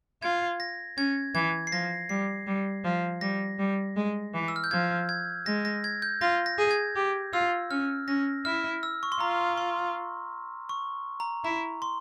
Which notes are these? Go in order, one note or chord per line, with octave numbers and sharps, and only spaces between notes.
F4 G#6
A#6
C#4 G#6
E3 G#6
C7
F3 A#6
G3 C7
G3
F3
G3 A#6
G3
G#3
E3
E6
F6
G6
F3 G#6
G#6
G#3 A#6
A#6
G#6
G6
F4 A#6
A#6
G#4
G#6
G4
F4 E6
C#4 F6
C#4 A#6
E4 F6
E6
C#6
C6
F4 A#5
C6
C#6
A#5
E4 A#5
C6